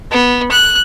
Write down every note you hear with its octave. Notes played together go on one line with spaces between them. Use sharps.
B3
F#6